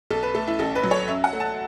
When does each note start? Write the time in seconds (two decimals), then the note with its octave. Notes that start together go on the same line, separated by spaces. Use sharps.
0.10 B1 A4
0.23 B4
0.35 A3 A4
0.47 E4
0.59 A1 A4
0.75 B4
0.83 F#3
0.91 C#5
1.08 F#2 E5
1.24 F#5
1.33 A3
1.40 A5